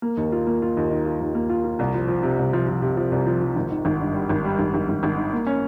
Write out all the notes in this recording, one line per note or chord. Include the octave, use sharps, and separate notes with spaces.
A#3
D#2
F4
A#3
F4
D#2
D#3
F4
D#2
A#3
F4
F4
C2
F3
F3
C3
C2
F3
F3
C3
F3
C2
F3
F3
G#1
D#3
G#1
G2
G3
G#1
G3
G#1
G#1
G#1
G#1
D#3
A#3
C#4